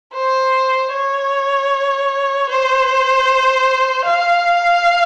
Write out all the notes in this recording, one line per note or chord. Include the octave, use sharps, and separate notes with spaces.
C5
C#5
C5
F5